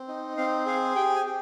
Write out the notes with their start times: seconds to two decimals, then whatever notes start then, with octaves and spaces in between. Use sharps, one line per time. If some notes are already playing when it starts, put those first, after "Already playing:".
Already playing: C4
0.08 D#4
0.37 C4 F5
0.66 G#4 F5
0.95 G4 G5
1.16 G#5
1.26 G4